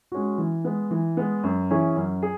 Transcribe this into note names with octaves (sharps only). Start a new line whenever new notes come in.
G#3 C#4 F#4
E3
G#3 B3
E3
G#3 B3
F#2
E3 C#4 E4 G#4
F#2
G#4